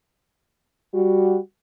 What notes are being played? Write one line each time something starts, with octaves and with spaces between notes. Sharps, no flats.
G3 F#4